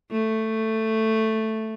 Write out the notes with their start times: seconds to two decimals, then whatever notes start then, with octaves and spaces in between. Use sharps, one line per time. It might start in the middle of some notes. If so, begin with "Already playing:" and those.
0.11 A3